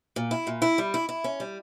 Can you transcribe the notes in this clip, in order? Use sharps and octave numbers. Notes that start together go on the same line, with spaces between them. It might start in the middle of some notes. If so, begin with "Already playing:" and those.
A#2
E4
A#2
E4
G3
E4
E4
C#4
G3